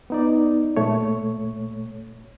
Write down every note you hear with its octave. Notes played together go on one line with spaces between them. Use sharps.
B3 D#4 D5
A#2 A3 C#5